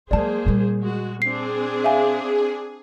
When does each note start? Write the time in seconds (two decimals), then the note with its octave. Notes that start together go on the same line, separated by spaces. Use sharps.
0.11 F#3 G#3 A#3 G#4 C5 D5 A5
0.46 A#2 G3
0.80 G#3 F#4
1.22 C4 D4 G#4 C7
1.84 E5 F5 G#5